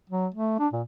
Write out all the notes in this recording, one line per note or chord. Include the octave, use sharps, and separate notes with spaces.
F#3
A3
D4
A#2